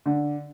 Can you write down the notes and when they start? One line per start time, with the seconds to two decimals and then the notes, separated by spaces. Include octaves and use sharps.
0.06 D3